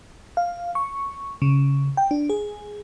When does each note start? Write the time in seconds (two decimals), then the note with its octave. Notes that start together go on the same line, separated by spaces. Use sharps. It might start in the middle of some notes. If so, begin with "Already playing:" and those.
0.37 F5
0.75 C#6
1.42 C#3
1.97 G5
2.11 D4
2.30 G#4